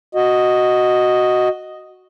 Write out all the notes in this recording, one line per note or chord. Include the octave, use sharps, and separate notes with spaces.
F#4 D#5